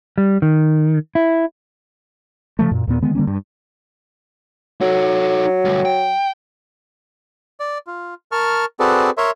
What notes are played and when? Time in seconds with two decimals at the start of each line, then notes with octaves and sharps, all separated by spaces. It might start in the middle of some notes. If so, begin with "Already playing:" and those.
0.18 G3
0.42 D#3
1.15 E4
2.59 C#3 F3 A3
2.71 F#2 A#2
2.87 D#2 A#2 B3
3.02 D3 D#3 G#3 B3
3.15 D3 G3 A#3 C#4
3.27 G2
4.81 F#3 D#4 A4
5.65 D2 G2
5.85 G5
7.60 D5
7.87 F4
8.32 A#4 A5 C#6 F6
8.80 C4 F#4 G#4 A4 B4 D5
9.18 A#4 C#5 E5 C6